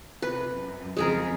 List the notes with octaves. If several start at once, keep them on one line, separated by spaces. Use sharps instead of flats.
C3 B4
F#2
F2 C#3 G#3 G#4 A#4